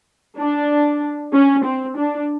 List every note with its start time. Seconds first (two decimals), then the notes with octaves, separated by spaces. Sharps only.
0.37 D4
1.33 C#4
1.64 C4
1.96 D4